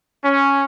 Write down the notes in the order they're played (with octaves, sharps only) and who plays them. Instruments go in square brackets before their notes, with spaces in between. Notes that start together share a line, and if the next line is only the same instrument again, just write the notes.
[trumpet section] C#4